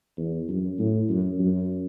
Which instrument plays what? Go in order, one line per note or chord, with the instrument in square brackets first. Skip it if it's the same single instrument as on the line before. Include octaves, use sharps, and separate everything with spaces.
[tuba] E2
F#2
A2
F#2
F#2